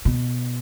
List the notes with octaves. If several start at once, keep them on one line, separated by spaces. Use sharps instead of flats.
B2